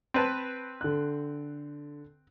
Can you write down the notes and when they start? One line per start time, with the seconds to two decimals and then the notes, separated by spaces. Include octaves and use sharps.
0.14 C4 B4 A5
0.81 D3 F#6